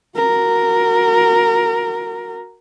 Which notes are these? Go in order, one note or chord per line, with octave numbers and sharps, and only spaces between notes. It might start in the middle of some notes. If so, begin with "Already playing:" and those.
F#4 A#4